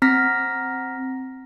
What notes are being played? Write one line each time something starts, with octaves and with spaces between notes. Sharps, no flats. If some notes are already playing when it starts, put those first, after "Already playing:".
C4 A#5 F6 A#6 B6